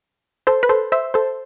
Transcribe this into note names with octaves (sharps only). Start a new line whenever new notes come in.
A4 C5
B4
A4 C5
C5 E5
A4 C5